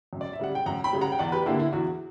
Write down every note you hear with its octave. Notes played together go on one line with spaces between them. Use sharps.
F#2
D5
E5
C#3 G3 F#5
G5
F#2 F#5 A#5
G5 B5
C#3 G3
F#5 A#5
G5
E2 D5 F#5
G4 B4
D3 A#3 E4 G4
E4
E2 F#4